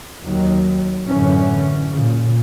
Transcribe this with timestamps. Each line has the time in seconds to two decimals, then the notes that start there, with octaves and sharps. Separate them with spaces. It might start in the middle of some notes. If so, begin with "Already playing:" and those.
0.23 D#2 D#3 F#3
1.07 F#2 A2 D3 E3 C#4
1.91 A#2 C#3